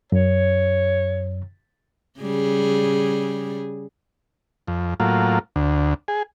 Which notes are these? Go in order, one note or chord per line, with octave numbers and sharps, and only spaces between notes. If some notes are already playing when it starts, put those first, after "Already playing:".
F#2 C#5
C#3 G3 G#4
F2
A2 F#3 A#3 F4
D2
G#4